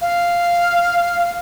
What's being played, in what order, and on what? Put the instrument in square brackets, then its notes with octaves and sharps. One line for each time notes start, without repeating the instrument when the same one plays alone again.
[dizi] F5